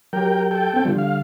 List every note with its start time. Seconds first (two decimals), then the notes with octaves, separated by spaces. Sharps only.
0.13 F#3 G4 A#4 G5
0.51 A4 G5
0.74 B3 C4
0.85 D3 F3 G3
0.98 F5